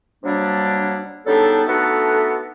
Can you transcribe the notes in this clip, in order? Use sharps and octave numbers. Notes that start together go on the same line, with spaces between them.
C3 F#3 G3 A#3 D4
C#3 G3 B3 D4 D#4 A4
A3 B3 D4 D#4 F#4 A4